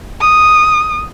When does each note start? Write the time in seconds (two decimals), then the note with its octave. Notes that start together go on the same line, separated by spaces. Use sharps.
0.21 D#6